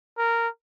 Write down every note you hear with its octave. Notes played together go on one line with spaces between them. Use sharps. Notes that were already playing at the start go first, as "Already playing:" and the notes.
A#4